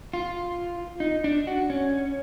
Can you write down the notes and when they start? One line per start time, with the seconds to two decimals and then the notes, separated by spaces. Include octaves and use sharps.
0.13 F4
1.00 D#4
1.24 D4
1.47 F#4
1.70 C#4